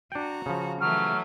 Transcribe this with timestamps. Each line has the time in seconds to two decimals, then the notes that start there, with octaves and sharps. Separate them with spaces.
0.12 D4 F#4 G5 A#5
0.46 C#3 F3
0.81 E3 F#3 A3 F6